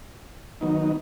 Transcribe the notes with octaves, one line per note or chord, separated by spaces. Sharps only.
D#3 F#3 B3 D#4